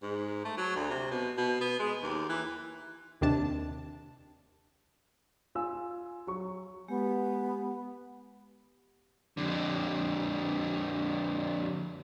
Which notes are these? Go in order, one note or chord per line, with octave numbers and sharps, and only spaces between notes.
G#2
A3
F#3
D2
C3
B2
B2
B3
G#3
D#2
E3
D#2 C3 D4 A5
F4 G#5 E6
F#3 C#6
G#3 B3 G4
F2 D3